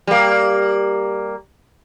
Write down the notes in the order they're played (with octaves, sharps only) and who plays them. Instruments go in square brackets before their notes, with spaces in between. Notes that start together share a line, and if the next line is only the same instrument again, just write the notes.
[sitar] G3 A#3